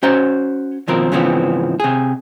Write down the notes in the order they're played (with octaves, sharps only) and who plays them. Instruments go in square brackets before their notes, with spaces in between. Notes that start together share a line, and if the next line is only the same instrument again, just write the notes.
[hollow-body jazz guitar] C#4 F#4 C5 A#5
D#2 B2 F3 C4 A#4
G#2 C#3 E3 F3 B3 C4
C3 G#4